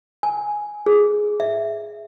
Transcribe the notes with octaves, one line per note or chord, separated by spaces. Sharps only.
G#5
G#4
E5